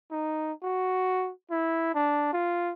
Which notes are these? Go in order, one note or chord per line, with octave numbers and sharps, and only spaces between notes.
D#4
F#4
E4
D4
F4